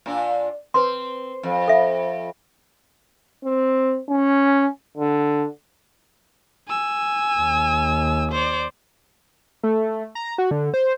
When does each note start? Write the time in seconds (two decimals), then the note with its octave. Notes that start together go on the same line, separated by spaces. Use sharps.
0.06 A#2 D4
0.74 C4 B4 C6
1.43 F2
1.68 A4 E5
3.44 C4
4.09 C#4
4.97 D3
6.68 G#5 E6
7.39 D#2
8.32 C5 D5
9.63 A3
10.15 A#5
10.38 F#4
10.51 D3
10.74 C5